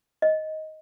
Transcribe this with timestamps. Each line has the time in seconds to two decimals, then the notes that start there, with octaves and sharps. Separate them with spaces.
0.22 D#5